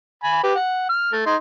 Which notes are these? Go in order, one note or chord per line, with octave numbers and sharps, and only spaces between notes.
G#5 B5
G4 B4
F#5
F6
A3
D#4 C6